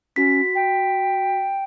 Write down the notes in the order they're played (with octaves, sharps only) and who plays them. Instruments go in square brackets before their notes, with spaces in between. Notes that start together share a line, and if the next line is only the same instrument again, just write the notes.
[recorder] C#4 [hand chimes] F#4 B6
[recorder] G5